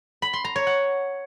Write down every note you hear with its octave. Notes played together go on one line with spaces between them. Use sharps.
B5
C6
A#5
C#5
F#5